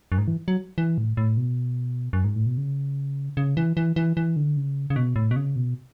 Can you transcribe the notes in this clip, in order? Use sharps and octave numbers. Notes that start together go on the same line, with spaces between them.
F#2
G#2
E3
F#3
E3
A2
A2
B2
F#2
G#2
A2
B2
C#3
C#3
E3
E3
E3
E3
D3
C#3
C#3
B2
A2
B2
C#3
B2